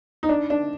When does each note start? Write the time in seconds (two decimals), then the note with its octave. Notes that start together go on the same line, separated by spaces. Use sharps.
0.23 D#4
0.29 D4
0.50 D4